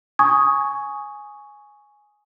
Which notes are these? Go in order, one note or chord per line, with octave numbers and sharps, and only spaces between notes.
G#5 C#6 D#6 G#6